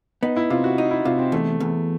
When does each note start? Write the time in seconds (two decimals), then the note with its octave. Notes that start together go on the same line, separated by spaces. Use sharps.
0.23 B3 D#4
0.37 E4
0.50 C3 F4
0.64 F#4
0.78 D#4
0.91 E4
1.05 C3 F4
1.19 C4
1.32 E2 A3
1.60 E2